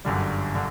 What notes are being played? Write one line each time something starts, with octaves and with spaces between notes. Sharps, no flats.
G1 F#2 D3 G3
D3